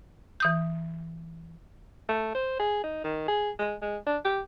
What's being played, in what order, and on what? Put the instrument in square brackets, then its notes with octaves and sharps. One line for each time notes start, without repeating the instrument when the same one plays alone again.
[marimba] E3 D#6 G6
[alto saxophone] A3
C5
G#4
D#4
D#3
G#4
G#3
G#3
D4
G4